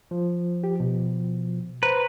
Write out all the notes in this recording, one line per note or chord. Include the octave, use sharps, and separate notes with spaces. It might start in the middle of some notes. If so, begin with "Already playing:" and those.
F3
G4
B2
B4 C5 A#5